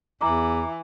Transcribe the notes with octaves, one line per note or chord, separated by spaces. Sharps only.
E2 E3 A#5 D6